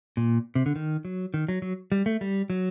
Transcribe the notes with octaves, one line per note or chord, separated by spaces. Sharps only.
A#2
C3
D3
D#3
F#3
D#3
F#3
F#3
G3
A3
G3
F#3